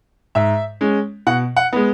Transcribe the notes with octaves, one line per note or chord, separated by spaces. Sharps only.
G#2 E5
G#3 C#4
B2 F#5
F#5
G#3 B3